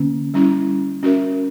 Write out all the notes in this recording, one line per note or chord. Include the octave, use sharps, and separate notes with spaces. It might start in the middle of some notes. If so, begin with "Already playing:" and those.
Already playing: D3 A#3 C#4
G3 C#4 E4
C#4 F#4 A#4 E5